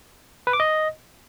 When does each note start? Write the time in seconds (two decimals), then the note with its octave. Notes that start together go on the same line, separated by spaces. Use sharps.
0.47 B4
0.53 D6
0.60 D#5